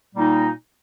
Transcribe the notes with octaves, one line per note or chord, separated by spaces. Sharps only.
A#2 G3 A#3 D#4